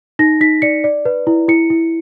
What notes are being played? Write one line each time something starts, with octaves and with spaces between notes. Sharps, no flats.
D#4 A#6
D#4 B6
D5 C#7
D5
B4
E4
E4 C#7
E4